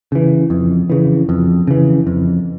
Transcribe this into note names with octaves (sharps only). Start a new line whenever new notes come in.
C#3 E3
F2
C#3 E3
F2
C#3 E3
F2